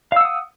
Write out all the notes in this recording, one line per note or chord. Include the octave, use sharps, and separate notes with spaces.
F5 F#5 D#6 E6